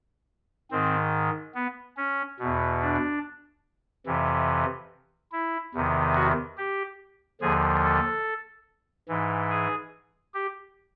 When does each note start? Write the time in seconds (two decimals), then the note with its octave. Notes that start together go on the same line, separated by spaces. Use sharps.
0.71 G#2 D#3 C4
1.54 B3
1.97 C#4
2.39 E2 B2
2.81 D4
4.06 F2 C3 E3
5.32 E4
5.74 E2 C3 D#3
6.15 F#4
6.57 G4
7.41 D#2 D3 F3 G#4
7.83 A4
9.08 G#2 E3
9.50 G#4
10.34 G4